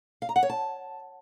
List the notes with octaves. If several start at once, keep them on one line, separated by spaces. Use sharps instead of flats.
F5
A#5
F#5
C#5
A5